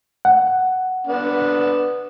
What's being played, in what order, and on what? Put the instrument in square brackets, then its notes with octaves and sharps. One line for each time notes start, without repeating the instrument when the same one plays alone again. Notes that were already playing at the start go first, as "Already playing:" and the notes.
[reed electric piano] F#5
[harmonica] B3 D4